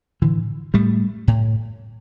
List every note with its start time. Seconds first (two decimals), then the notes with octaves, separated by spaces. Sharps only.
0.22 A2 D3 E3
0.74 A2 G3 A3
1.28 A2